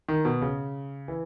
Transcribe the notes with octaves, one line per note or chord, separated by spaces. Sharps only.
D#3
B2
C#3
E3